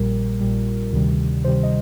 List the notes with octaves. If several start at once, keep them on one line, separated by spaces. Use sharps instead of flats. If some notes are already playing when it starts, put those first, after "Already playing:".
Already playing: A#1 A#2 G3 A#4
A#1 A#2 G3
D2 C3 D#3 G3
D2 C3 D#3 G3 C5
D#5